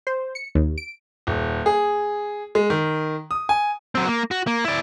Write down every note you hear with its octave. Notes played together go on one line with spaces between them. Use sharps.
C5
C#7
D#2
D7
D#1
G#4
G#3
D#3
D#6
G#5
F#3 C4
A#3
F#4
A#3
E4 D5